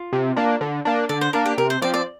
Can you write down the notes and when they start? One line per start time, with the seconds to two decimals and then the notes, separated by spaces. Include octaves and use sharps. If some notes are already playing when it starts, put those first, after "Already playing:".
Already playing: F4
0.13 C3
0.36 A#3 D4
0.61 D3
0.85 A#3 D4
1.09 D3 D5
1.21 C5
1.33 A#3 D4 A#4
1.46 G4
1.57 C3 A#4
1.70 C5
1.82 F3 C4 D5
1.94 D5